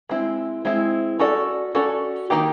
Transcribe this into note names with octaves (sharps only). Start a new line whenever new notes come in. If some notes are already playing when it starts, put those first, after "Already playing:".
G#3 C4 E4
G#3 C4 E4
C#4 F#4 A4 D5
C#4 F#4 A4 D5
D#3 F#3 A#3 D#4 G4